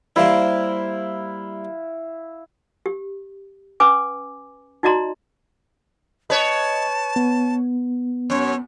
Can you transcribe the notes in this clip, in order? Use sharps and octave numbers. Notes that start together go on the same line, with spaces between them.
G3 A#3 E4 C5 F5
G4
C#4 B4 G#5 D6
D#4 F#4 D5 D#5 A#5 C6
B4 C#5 D#5 A5
B3
F#2 C#5